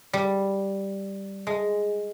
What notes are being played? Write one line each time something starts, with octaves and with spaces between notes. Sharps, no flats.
G3
G#3